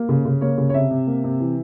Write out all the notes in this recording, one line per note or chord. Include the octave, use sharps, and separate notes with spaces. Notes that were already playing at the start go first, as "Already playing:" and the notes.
Already playing: A#3
C#3
C#3
A#3 C#5
C#3
C#5
C3 E5
C3
A#3
C3
E3